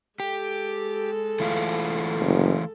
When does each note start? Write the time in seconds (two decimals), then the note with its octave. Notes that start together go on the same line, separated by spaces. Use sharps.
0.20 G#3 G4 A4
1.40 E3 A3 F4
2.20 F#1